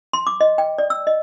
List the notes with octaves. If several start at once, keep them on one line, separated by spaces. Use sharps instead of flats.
C6
D6
D#5
G5
D5
E6
D#5